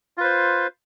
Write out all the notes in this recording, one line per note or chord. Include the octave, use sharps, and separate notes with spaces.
F4 B4 C5